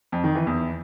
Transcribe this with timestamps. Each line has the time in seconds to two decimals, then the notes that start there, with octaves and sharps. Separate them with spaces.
0.12 F2
0.24 D#3
0.35 E3
0.47 E2